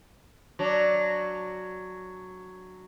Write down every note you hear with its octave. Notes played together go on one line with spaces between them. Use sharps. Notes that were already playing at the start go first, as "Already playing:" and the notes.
F#3 D4